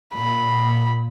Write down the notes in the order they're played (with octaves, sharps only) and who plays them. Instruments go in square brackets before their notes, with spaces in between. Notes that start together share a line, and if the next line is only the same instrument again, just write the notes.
[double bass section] A#2 [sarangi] B5